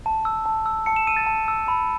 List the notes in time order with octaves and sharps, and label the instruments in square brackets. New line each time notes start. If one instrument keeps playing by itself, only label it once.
[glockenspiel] A5
E6
A5
E6
A5 C#7
E7
E6 D#7
A6
A5
E6
B5